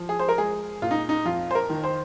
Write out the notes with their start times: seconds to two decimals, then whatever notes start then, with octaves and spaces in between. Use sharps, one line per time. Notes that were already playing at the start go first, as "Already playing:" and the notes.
Already playing: F3
0.09 G#4
0.19 C5
0.29 A#4
0.38 G#3 G#4
0.82 A#2 F4
0.91 D#4
1.09 D#4
1.25 F2 F4
1.51 C5
1.55 A#4
1.70 D#3
1.84 C5